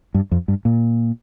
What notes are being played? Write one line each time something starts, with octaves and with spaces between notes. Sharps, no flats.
G2
F2
G2
A#2